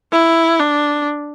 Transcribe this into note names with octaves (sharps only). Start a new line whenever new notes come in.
E4
D4